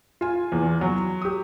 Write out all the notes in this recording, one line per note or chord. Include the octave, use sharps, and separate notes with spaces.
F4 G#5
E2
F#3
G4 D#6